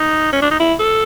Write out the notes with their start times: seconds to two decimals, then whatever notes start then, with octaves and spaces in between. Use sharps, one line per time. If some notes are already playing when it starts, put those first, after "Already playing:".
Already playing: D#4
0.33 C#4
0.42 D4
0.51 D#4
0.60 E4
0.80 A4